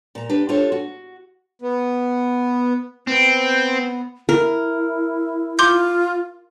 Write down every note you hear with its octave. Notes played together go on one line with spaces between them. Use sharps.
A#2 A#5
D4 G4 B4
D4 F4 G4 A4 C5 C#5
F#4
B3
B3 C4
E4 A#4
F4 C6 D6 G6